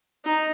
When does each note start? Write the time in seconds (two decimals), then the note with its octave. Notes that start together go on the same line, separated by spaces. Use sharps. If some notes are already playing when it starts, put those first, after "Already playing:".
0.25 D#4